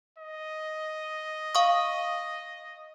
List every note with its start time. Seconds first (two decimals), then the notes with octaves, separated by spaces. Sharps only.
0.18 D#5
1.55 F5 C#6 D#6